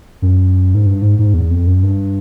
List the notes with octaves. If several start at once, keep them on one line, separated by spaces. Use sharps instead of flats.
F#2
G#2
G2
G#2
G#2
E2
F2
F#2
G2